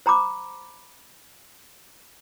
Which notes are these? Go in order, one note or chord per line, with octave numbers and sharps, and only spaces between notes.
C5 A#5 B5 D6